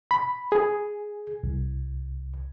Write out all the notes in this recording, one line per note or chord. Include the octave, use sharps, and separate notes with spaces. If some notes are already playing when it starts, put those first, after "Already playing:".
B5
G#4
C2